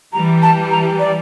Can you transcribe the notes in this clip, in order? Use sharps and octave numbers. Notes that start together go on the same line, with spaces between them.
E3 G3 A#5
A5
A#5
D5